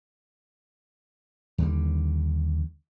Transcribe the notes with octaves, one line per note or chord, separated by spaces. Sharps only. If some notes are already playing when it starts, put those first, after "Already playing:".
D#2 D3 F#3 G3